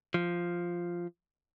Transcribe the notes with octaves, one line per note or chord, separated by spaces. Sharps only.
F3